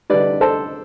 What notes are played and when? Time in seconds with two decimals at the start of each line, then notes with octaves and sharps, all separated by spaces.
0.10 D3 G3 B4 D5
0.41 A4 C5